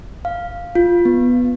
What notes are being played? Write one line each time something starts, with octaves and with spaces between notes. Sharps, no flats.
F5
F4
B3